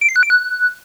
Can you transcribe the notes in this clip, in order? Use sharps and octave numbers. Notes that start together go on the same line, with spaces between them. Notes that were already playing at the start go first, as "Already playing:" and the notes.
D7
C7
F#6
D7
F#6